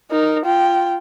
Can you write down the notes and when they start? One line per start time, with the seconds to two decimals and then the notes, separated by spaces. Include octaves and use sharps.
0.11 D#4 A#4
0.45 F4 G5